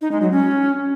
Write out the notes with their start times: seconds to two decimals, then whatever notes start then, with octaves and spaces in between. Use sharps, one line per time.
0.01 D#4
0.12 G#3
0.22 F#3
0.32 C#4